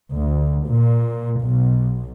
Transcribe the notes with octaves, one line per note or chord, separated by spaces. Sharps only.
D2
A#2
B1